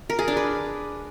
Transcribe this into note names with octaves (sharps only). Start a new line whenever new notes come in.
A#4
G#4
D4
B4